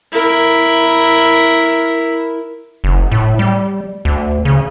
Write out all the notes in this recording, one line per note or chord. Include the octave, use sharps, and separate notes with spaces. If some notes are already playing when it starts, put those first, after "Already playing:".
E4 A#4
F#1
A2
G3
D2
C#3